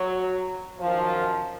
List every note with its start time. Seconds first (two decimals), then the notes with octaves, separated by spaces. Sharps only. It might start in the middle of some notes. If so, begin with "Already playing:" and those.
Already playing: F#3
0.80 F#2 D#3 F3